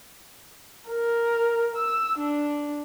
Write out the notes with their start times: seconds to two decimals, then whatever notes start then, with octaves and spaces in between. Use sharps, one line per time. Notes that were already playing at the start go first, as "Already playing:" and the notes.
0.89 A#4
1.76 E6
2.18 D4